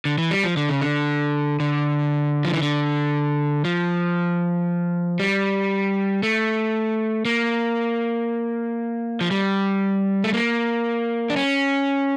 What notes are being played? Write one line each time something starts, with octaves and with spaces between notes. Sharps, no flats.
D3
E3
G3
F3
D3
C#3
D3
D3
F3
E3
D3
F3
G3
A3
A#3
F3
G3
A3
A#3
D4
C#4